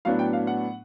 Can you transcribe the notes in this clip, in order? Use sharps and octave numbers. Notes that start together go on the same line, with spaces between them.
A2 F#3 B3 D4 F5
G5
F5
F#5